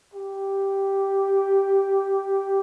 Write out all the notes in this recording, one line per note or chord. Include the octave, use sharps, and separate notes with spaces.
G4